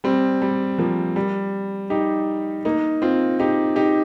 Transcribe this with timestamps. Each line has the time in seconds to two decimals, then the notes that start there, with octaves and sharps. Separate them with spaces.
0.04 G3 C4
0.42 G3
0.78 F3 A#3
1.16 G3
1.90 D#4 G4
2.65 A#3 D#4
3.02 C4 F4
3.40 D#4 G4
3.76 D#4 G4